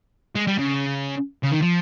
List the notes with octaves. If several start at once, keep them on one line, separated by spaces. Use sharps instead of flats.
G#3
G3
C#3
C#3
D#3
F3